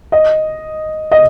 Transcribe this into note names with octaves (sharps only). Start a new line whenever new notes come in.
D#5
D#5